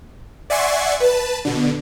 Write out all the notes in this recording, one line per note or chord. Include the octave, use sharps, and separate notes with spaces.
D5 E5 F#5 G#5 C6 C#6
B4 A5
B2 D3